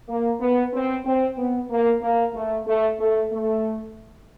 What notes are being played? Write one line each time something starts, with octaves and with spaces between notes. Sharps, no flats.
A#3
B3
C4
C4
B3
A#3
A#3
A3
A3
A3
A3